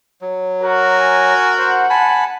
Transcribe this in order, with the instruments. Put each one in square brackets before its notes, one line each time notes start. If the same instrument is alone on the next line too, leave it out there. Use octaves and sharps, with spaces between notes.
[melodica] F#3
[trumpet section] F#4 A#4
[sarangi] G#5
[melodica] C5 [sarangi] F#5
[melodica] G#5 A5 B5